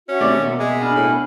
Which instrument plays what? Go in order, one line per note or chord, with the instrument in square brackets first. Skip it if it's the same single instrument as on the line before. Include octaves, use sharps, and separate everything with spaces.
[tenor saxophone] C#4 [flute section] F#4 E5
[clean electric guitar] C3 D#3 A3 [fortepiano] D5
[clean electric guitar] B2 A#3 [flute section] E5
[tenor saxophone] G#3
[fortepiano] D4 [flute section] G#5 B5 F6
[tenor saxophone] A2